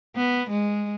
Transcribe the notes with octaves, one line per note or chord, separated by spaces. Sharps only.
B3
G#3